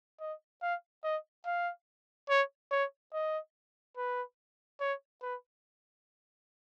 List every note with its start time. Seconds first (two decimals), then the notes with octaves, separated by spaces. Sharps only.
0.20 D#5
0.62 F5
1.04 D#5
1.45 F5
2.29 C#5
2.71 C#5
3.13 D#5
3.97 B4
4.80 C#5
5.22 B4